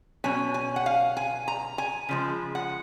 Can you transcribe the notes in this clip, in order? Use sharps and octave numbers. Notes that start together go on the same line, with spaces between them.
B2 F#3 C#4 G#5
G#5
F#5
F5
G#5
A#5
G#5
C#3 F3 G#3
F#5